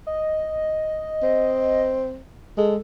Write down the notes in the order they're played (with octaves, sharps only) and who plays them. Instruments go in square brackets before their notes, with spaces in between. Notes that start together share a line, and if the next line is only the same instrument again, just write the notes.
[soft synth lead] D#5
[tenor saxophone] C4
[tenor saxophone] G#3 [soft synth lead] A4